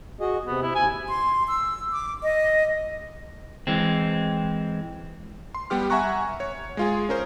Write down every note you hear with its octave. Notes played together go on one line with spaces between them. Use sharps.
F#4 G#4 D#5
C3 B3
E4
D#2 G#5
C6
E6
D6
D#5
E3 G#3 C4
C6
G3 B3 G4 F6
E5 F#5 G#5 A#5 C#6 F#6
C#5
G#3 F4 G#4
C#4 A#4 C5